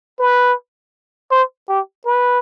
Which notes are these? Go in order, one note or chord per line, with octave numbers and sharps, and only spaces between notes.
B4
C5
G4
B4